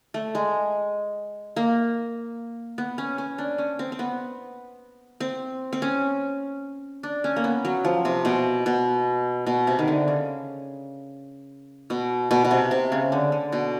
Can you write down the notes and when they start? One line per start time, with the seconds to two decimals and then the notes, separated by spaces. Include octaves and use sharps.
0.14 A3
0.35 G#3
1.56 A#3
2.78 B3
2.98 C#4
3.18 C#4
3.38 D4
3.58 C#4
3.79 C4
3.92 C4
3.99 B3
5.20 C4
5.73 C4
5.82 C#4
7.03 D4
7.24 C#4
7.36 A#3
7.44 B3
7.65 F#3
7.85 F3
8.05 C3
8.25 B2
8.66 B2
9.47 B2
9.67 C3
9.79 D#3
9.88 D3
10.08 C#3
11.90 B2
12.31 B2
12.45 B2
12.51 C3
12.71 C3
12.92 C#3
13.12 D3
13.32 D3
13.52 B2